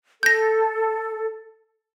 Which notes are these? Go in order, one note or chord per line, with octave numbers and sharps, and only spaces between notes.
A4 G6 A#6